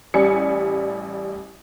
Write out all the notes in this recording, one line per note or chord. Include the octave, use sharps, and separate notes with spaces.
A1 G3 G#5 C#7